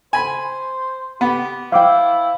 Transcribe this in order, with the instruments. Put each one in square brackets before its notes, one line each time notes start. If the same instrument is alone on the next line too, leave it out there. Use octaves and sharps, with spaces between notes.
[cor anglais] C5 [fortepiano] G#5 B5
[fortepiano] B3 [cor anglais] G4
[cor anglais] E4 [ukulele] C5 G5 [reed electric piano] F5 D6